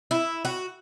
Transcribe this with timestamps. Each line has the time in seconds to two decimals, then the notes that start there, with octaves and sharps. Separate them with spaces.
0.11 E4
0.45 F#4